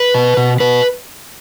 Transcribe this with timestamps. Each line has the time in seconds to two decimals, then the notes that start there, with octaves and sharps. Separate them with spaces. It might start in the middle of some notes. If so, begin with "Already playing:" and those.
Already playing: B4
0.14 B2
0.37 B2
0.60 B2 B4